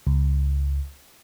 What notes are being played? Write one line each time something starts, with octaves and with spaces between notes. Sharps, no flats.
C#2